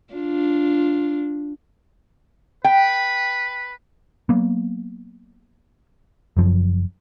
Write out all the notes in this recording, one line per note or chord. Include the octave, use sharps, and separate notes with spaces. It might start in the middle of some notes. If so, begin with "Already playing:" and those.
D4 F4
B4 G5
F#3 A#3 B3
F#1 F#2 F3